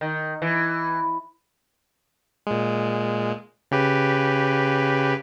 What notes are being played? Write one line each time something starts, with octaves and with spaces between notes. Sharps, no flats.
D#3
E3
A#2 G#3
C#3 G4 B4